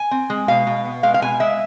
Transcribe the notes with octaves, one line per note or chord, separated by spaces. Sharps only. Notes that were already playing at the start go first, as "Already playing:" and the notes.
Already playing: G#5
C4
G#3
B2 F5
B2
B3
G#3 F5
F5
B2 G#5
G#3 E5